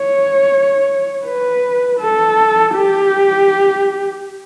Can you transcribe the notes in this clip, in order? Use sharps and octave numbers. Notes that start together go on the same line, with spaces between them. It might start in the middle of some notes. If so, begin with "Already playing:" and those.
Already playing: C#5
B4
A4
G4